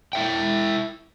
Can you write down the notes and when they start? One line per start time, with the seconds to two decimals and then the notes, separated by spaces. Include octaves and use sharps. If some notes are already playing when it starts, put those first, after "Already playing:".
0.13 E4 E5 G5